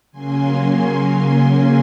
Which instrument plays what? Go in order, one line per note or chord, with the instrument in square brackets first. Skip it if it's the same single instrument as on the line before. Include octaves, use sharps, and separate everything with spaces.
[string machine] C#3 F#3 A#3 C#4 G#5 C6